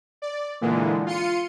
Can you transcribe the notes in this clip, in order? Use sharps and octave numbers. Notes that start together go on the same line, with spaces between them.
D5
A#2 D3 E3 G#3
F4 C6 C#7 D#7